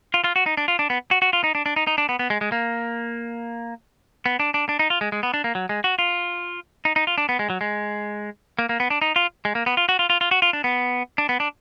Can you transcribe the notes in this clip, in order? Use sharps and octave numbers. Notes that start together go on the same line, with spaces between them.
F4
F4
F#4
D#4
D4
F4
D4
B3
F#4
F#4
F4
D#4
D4
D4
D#4
D#4
D4
B3
B3
G#3
G#3
A#3
B3
D4
D4
D4
D#4
F4
G#3
G#3
B3
D4
A#3
F#3
G#3
F#4
F4
D#4
D#4
F4
D4
B3
G#3
F#3
G#3
A#3
A#3
B3
D4
D#4
F4
G#3
A#3
B3
F4
F#4
F4
F4
F4
F#4
F4
D4
B3
D4
B3
D4